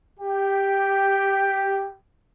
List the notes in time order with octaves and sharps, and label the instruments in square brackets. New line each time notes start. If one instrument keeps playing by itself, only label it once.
[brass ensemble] G4 [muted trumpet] G5